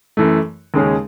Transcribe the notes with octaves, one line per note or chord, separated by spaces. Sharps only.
F#2 E3 A3
D#2 C#3 G#3 C#4 G#4